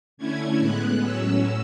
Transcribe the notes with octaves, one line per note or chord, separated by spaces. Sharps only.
D3 A3 C#4 E4 G#6
A2 G#3 B3 F#6
A2 F#3 C#4 E6